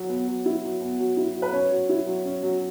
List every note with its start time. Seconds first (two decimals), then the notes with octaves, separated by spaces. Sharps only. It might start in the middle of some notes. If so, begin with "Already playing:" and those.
Already playing: F#3
0.09 B3
0.27 F#3
0.46 E4
0.63 F#3
0.81 B3
0.99 F#3
1.17 E4
1.34 F#3
1.42 B4
1.53 C#4 C#5
1.71 F#3
1.89 E4
2.06 F#3
2.25 C#4
2.43 F#3